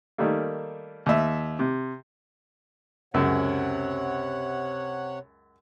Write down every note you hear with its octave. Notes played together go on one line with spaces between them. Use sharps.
D#3 G3 A3 A#3
D#2 E5
C3
C#2 F#2 C3 C#5 F#5